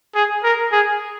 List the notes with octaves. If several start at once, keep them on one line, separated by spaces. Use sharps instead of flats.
G#4
A#4
G#4